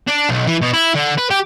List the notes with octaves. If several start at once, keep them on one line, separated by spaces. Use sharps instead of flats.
D4
B1
E3
B2
E4
D3
B4
G4